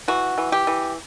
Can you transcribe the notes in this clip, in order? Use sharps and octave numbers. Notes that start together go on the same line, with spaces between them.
E3 F#4
E3
G4
E3